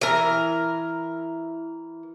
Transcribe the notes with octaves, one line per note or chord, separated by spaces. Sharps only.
E3 A#4